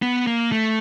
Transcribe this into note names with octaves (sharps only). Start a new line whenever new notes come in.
B3
A#3
A3